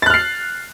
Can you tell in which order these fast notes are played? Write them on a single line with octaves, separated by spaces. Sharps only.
A6 F#6 F6 C7